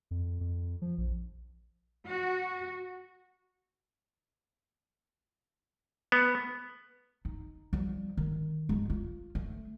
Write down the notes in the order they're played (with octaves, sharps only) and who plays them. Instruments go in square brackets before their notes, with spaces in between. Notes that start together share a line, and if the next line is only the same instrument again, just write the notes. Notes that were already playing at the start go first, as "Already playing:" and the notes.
[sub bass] F2
F2
F3
A#1
[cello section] F#4
[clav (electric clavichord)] B3
[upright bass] D#4
F3 G3
D#3
G#3 D4
F4
A3